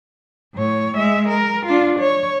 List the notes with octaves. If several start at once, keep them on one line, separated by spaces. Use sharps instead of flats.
A2 C#5
G#3 E5
A#4
D4 F4
C#5